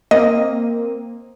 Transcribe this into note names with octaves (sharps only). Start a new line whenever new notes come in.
A#3 C4 D#5